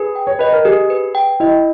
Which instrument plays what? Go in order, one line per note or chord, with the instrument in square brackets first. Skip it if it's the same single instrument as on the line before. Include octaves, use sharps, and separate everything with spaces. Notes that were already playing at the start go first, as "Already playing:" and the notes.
Already playing: [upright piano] G#4 [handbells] B4
[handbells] G5
[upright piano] C#5
[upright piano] B4 [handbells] D#5
[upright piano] A#4
[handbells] G4 [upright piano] G#4
[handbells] B4
G5
[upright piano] E4 [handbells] D#5